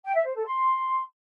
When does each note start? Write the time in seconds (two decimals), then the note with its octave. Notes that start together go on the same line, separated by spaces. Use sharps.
0.03 G5
0.14 E5
0.25 C5
0.35 A4
0.46 C6